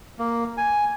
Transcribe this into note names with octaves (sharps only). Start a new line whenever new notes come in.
A#3
G#5